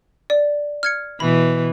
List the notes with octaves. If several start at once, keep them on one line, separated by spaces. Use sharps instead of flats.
D5
F6 G#6 C#7
B2 E3 B5